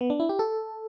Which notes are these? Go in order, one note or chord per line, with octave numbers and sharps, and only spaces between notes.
B3
D4
E4
G4
A4